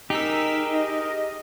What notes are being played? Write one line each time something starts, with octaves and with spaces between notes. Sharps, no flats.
D#4 G4 G#4 A#4 E6 B6
D#5